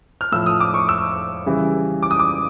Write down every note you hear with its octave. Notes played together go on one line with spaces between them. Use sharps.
F6
A2 F3 E6
D#6
D6
C#6
E6
C#3 E3 G3
D6
D#6
D6